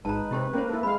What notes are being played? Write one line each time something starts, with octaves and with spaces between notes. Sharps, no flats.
G#1 G#3 D#4 B4 A5 A#5
C3 E4 G4 C5
A#3 C#4 A#4 C5
E4 A4
G#3 C4 F5 B5